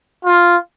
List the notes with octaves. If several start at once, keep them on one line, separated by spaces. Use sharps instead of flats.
F4